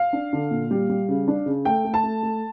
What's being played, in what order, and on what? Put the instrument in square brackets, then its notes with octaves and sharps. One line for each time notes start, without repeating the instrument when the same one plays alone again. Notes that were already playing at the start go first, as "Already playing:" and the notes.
Already playing: [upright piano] F5
D4
D3
A#2
G3
G3
C#3
D4
C#3
A3 G5
A3
A5
A3
A3